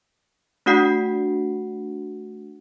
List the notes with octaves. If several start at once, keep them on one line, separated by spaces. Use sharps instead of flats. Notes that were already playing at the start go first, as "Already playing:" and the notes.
A3 D4 F#4 F#5 C7